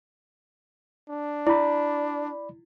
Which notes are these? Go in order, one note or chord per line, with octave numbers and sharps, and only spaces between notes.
D4
E4 D5 B5